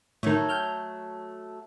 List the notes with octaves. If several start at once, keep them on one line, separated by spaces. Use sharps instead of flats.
A2 D#3 F#3 A3
G5 F6 G6